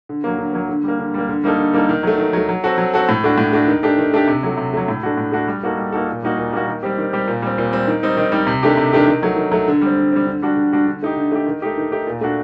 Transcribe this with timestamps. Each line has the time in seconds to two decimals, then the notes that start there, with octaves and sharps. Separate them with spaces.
0.09 D3
0.24 F#3 A#3
0.38 D3
0.53 F#3 A#3
0.69 D3
0.84 G3 A#3
0.99 D3
1.14 G3 A#3
1.29 D3
1.44 G3 A#3 D#4 A4
1.58 D3
1.73 G3 A#3 D#4 A4
1.89 D#3
2.03 F#3 A3
2.18 D#3
2.33 F#3 A3
2.49 F#3
2.64 C4 F#4 A4
2.78 F#3
2.94 C4 F#4 A4
3.09 A2
3.24 A3 D4 F#4
3.38 A2
3.53 A3 D4 F#4
3.68 D#3
3.83 A3 D4 G4
3.98 D#3
4.14 A3 D4 G4
4.27 C3
4.43 F#3 A3
4.57 C3
4.74 F#3 A3
4.88 A2
5.03 A3 D4 F#4
5.17 A2
5.32 A3 D4 F#4
5.48 G3
5.63 A#3 D#4 F#4 A4
5.77 G3
5.92 A#3 D#4 F#4 A4
6.08 A#2
6.23 G3 A#3 D#4 F#4
6.38 A#2
6.52 G3 A#3 D#4 F#4
6.68 D#3
6.83 G3 C4 G4
6.98 D#3
7.13 G3 C4 G4
7.28 A#2
7.42 G3 C4
7.58 A#2
7.73 G3 C4
7.87 D#3
8.03 G3 C4 D#4
8.17 D#3
8.32 G3 C4 D#4
8.47 C3
8.63 D#3 A3 D4 G4
8.77 C3
8.93 D#3 A3 D4 G4
9.07 D#3
9.23 F#3 A3
9.37 D#3
9.52 F#3 A3
9.68 D3
9.82 G3 C4
9.98 D3
10.12 G3 C4
10.26 D3
10.42 G3 D4 F#4
10.57 D3
10.73 G3 D4 F#4
10.87 D3
11.03 A3 D#4 G4
11.17 D3
11.32 A3 D#4 G4
11.47 D#3
11.62 A3 D#4 G4
11.77 D#3
11.92 A3 D#4 G4
12.07 A#2
12.21 A3 D4 F#4